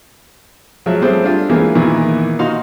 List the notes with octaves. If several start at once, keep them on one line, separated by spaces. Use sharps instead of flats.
F3 F#3 G#3 E5
G3 A3 C4 G#4 C5
D4 F4 G4
E3 G#3 A#3
A#2 D#3 E3 B3
A#2 D#4 F#4 F5 C6